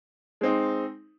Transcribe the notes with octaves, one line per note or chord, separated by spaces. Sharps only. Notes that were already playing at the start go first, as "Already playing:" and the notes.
G#3 C4 D#4